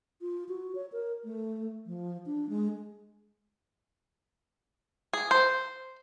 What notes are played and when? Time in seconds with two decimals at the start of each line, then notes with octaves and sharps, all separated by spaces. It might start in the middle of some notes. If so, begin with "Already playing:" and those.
0.21 F4
0.49 F#4
0.75 C#5
0.92 A#4
1.24 A3
1.86 F3
2.26 D4
2.49 G#3
5.13 G#4
5.31 C5